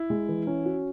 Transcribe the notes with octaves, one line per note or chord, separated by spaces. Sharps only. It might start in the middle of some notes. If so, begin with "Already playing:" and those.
Already playing: E4
G#3
E3
C#4
F#4